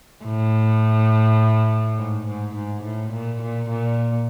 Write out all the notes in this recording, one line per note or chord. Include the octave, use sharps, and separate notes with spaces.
A2
G#2
G#2
G#2
A2
A#2
A#2
A#2